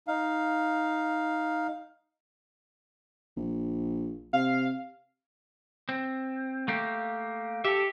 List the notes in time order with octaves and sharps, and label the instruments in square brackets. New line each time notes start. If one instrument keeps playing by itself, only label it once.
[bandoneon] D#4 F5
[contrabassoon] A#1
[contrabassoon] C3 [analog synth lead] F5
[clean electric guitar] C4
A3 A#3 G4
[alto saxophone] G4 [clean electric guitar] A4 E5